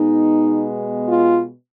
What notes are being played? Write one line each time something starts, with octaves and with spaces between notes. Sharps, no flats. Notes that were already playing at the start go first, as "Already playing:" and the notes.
Already playing: B2 G#3 B3 D#4
F4